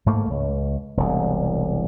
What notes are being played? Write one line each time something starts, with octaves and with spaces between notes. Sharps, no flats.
G#2 A3 A#3
C#2
E1 C2